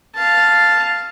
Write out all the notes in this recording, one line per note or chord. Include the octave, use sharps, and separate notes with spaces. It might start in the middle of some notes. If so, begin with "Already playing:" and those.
F5 A5